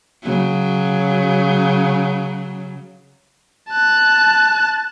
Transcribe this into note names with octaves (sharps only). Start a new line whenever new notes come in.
C#3 F#3
A5 F#6